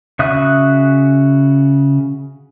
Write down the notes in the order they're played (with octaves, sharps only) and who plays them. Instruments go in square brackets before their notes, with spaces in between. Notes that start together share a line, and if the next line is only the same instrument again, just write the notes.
[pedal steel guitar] C#3 F#4 E5 D#6 F#6